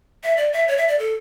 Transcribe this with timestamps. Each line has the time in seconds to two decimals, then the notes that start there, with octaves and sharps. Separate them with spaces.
0.23 E5
0.37 D5
0.53 E5
0.68 C#5
0.77 E5
0.88 D5
0.99 A4